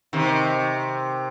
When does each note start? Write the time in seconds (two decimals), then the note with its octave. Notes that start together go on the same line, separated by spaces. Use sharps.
0.13 C3 D#3